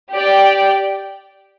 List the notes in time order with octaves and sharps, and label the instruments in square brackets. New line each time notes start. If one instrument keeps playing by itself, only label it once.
[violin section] G4 D5 G5